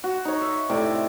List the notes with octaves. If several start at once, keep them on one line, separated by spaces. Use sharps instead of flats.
F#4
D#4 C#5
E5
A2 C3 D5